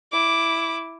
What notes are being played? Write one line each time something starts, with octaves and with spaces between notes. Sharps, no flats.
E4 D6